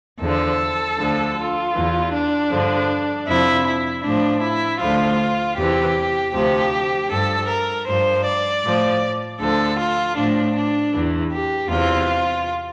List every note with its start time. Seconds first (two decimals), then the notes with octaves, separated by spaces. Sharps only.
0.21 E2 D3 F3 A4
0.98 D2 D3 F3
1.37 F4
1.75 E2 E3
2.13 D4
2.51 G2 D3 F3
3.28 F2 C3 F3 E4
3.66 E4
4.04 A2 F3 D4
4.42 E4
4.80 D2 D3 F3 F4
5.58 E2 C3 E3 G4
6.33 D2 C3 F3 G4
7.11 G2 F3 A4
7.48 A#4
7.87 G2 F3 C5
8.26 D5
8.64 A2 F3
9.40 D2 D3 F3 A4
9.79 F4
10.17 A2 F3 D4
10.55 D4
10.94 E2 E3
11.32 G4
11.70 E2 C3 E3 F4